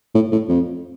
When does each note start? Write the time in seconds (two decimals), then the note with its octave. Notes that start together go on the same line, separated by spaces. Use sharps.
0.15 A2
0.32 A2
0.48 F2